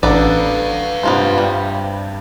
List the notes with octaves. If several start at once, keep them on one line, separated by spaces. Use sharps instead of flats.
A1 B3 D4 A4 B4 D5 F5 A#5
G2 C3 B3 F4 C5
G3